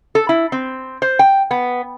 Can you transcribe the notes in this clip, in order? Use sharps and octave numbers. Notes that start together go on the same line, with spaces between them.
A4
E4
C4
C5
G5
B3